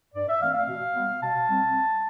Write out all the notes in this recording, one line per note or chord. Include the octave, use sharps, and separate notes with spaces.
G2 D5
E5
E3 A3 C4 F5
F5
B2
G3 B3
B2 A5
G3 C4